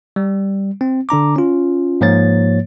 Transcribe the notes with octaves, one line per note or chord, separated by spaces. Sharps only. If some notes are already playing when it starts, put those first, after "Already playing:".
G3
C4
D3 D4 A#5 D6
C#4 F4
G#2 F3 A#3 C#5 A6